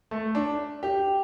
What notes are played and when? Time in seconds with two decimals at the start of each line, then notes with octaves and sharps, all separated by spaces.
0.11 A3
0.35 D4
0.83 G4